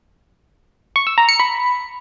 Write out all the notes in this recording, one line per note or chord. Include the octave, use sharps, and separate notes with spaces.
C#6
E6
A#5
C#7
B5